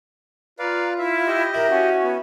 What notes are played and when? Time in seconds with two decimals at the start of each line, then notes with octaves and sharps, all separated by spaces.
0.59 F4 B4 D5 F5 A#5
0.98 E4 E5
1.27 G4 D#5
1.54 E4 A#4
1.71 C#4 F#4
2.04 B3